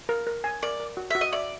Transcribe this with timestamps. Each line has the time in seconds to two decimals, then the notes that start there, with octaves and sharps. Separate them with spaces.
0.09 A#4
0.27 A#4
0.44 G#5
0.63 A#4 D5
0.80 A#4
0.97 F#4
1.11 F#4 E5
1.21 D#5
1.33 D5 E5